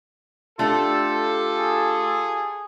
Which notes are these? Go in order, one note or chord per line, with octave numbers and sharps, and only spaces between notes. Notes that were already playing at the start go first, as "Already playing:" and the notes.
A3 D4 F4 G4 A4
G#4